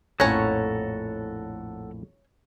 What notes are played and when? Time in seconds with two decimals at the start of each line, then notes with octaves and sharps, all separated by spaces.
0.20 A#1 F2 A2 C#4 A4 C#5 F#5 A#5